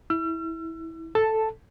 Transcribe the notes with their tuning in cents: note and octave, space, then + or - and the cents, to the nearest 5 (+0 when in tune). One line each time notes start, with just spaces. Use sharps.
E4 -15 E6 +40
A4 +0 A5 +0